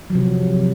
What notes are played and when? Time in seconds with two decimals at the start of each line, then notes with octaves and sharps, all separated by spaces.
0.10 F#3
0.12 F3
0.15 C3